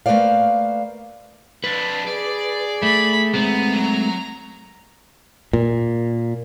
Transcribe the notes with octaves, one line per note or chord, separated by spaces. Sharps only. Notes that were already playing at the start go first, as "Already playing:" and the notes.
A3 A#3 B4 C5 D5 F5
F2 D4 B4
G#4 D5
A3 B5
G#3 A3 B3 C4 A#5
F#3
A#2